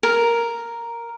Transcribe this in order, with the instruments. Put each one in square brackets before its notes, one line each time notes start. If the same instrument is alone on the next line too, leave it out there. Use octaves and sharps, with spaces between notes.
[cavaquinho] A#4